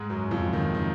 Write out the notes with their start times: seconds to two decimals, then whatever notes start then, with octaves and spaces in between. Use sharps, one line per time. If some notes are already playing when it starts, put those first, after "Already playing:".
Already playing: G#2 G#3
0.10 F#2 F#3
0.31 F2 F3
0.53 D#2 D#3
0.75 D#3